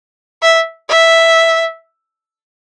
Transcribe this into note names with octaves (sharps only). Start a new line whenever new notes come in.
E5
E5